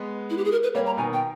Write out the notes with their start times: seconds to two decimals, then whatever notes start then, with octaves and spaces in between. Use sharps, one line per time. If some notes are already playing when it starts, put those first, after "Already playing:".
Already playing: G#3 B3
0.30 E4
0.37 G4
0.45 G#4
0.52 A#4
0.63 B4
0.75 G3 A#3 C#5
0.86 A#5
0.97 B2 D#3 G#5
1.13 G5